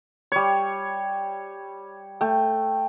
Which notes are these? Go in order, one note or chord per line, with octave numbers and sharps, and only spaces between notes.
G3 C#5
A3 G5